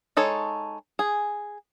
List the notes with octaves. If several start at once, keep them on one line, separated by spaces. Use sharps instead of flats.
G#3 D#4 A4 C#5
G#4